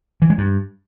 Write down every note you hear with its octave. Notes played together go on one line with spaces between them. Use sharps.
E3
G#3
G2